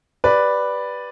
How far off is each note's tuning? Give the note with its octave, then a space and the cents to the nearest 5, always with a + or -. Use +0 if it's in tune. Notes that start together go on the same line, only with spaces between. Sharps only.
G4 +0 B4 +0 D5 +0